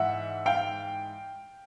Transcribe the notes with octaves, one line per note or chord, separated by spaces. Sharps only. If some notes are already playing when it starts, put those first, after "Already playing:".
Already playing: G#2 E3 E5 F#5
F5 G5